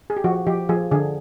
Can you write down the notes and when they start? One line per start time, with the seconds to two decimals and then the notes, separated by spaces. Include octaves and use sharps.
0.10 G#4
0.17 G4
0.24 F3 F#4
0.47 F3 G4
0.69 F3 G#4
0.91 D3 G#4